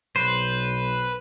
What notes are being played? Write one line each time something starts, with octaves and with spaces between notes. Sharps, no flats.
B1 B4 C5